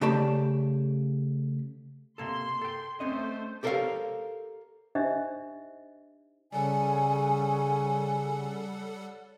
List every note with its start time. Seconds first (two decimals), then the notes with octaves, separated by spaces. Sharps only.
0.01 C#3 A3 G4 D5 A5 B5
2.18 C3 A#3 A4 C6
2.61 A4 G5
3.00 A3 C4 C#4 C5 D#5
3.63 G4 A4 A#4 C5 C#5 F5
4.95 D4 D#4 G4 C5 D#5 E5
6.52 C#3 G3 A4 C#5 D5 F#5 G#5